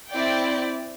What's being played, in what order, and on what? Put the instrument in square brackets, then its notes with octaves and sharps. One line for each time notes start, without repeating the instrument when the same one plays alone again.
[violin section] C4 E4 D5 G5